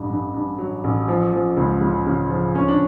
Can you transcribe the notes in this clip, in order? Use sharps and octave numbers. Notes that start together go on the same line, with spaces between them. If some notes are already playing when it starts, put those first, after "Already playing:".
Already playing: A1 G2
G2
G2
F#3
A1
F3
F3
C#2
C#3
C#3
F3
D2 C#4
D4